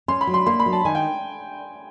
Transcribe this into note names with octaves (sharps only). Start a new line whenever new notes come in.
C#4 C6
B5
F#3
C6
A#3 C6
B5
F#3
A5
D#3 G#5
G5